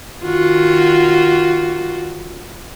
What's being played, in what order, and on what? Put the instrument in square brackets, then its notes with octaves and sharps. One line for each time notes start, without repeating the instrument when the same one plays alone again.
[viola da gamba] D#3 F4 F#4